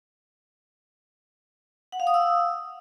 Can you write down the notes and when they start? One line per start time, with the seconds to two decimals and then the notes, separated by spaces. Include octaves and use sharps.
1.92 F#5
2.00 F5
2.07 D#6
2.14 E6